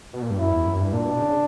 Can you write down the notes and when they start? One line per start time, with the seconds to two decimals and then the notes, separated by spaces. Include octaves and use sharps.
0.13 B2
0.22 A#2
0.30 G2
0.38 F#2 E4
0.52 E2
0.66 F#2
0.79 G2
0.93 A#2 D4
1.06 B2
1.20 C#3